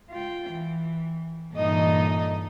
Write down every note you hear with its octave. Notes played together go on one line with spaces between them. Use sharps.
F4 G5
E3
G2 A#2 E3 D#4 A4 D#5